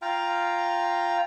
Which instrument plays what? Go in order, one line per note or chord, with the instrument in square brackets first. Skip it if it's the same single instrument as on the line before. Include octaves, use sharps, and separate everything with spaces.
[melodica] F4 F5 G5 A#5